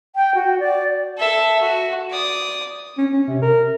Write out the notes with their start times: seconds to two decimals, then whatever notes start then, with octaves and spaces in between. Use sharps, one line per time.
0.16 G5
0.35 F#4
0.60 D5
1.18 A4 E5
1.61 F#4
2.11 D5 D#6
2.98 C#4
3.13 C#4
3.28 C3
3.42 A#4